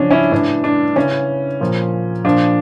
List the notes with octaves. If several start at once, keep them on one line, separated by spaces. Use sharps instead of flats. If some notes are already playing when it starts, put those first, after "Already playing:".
Already playing: C#3 F3 C#4 D4
C#4 E4
A2 E3 D4
D4
C#3 E3 C#4
A#2 F3
A#2 F3 D4